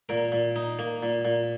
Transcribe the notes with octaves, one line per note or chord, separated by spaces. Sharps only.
A#2 A#4
A#2
D#4
A#3
A#2
A#2